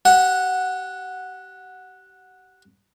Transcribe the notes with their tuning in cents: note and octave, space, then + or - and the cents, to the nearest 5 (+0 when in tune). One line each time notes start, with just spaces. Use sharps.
G4 -30 F#5 -5